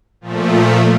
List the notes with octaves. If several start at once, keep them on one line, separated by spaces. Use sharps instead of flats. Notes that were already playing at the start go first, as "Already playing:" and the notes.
A#2 F3 A3